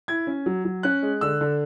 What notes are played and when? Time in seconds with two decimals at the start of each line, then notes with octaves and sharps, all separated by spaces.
0.08 E4 G#6
0.27 C#4
0.46 F#3
0.65 F#3
0.83 C#4 F#6
1.03 G#3
1.21 D3 E6
1.41 D3